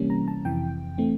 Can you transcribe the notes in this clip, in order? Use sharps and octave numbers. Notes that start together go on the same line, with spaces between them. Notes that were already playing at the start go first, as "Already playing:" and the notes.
Already playing: C3 E3 G3 A#3 C#4
A#5
A5
F2 C3 E3 G5
E3 A3 C4